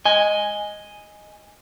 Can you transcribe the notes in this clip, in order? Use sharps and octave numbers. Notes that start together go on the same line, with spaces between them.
D#5 G#5